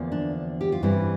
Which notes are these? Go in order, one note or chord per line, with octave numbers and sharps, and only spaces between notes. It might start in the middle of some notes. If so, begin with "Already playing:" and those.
Already playing: E2 D3 F3 A#3
D4
G4
F4
G2 E3 G3 C4 E4